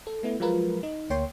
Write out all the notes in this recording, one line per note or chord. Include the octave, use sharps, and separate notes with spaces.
A4
A3 B3 E4
F3 F#3 G#3 F4 A#4 B4
D#4
D2 A#3 C#5 G5 C6